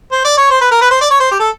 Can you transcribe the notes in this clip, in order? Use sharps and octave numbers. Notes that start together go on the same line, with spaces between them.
C5
D5
C#5
C5
B4
A#4
B4
C5
D5
C#5
C5
G4
A4